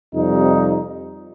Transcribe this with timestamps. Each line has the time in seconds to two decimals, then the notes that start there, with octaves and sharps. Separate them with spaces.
0.14 F2 C3 G3 D#4